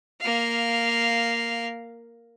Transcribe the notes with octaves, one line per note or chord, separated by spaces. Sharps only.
A#3 F5